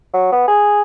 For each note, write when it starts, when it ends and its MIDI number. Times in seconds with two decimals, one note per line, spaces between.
0.14 0.31 54
0.32 0.44 59
0.48 0.82 68